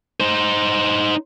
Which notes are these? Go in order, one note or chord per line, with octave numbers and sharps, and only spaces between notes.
D#4 C5